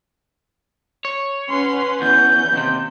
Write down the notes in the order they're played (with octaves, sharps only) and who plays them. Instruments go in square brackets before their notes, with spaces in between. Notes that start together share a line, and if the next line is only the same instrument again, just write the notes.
[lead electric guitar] C#5
[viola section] C#4 B4 F#5 [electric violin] C6
[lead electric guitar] E2 [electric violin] G6
[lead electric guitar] D#2 C3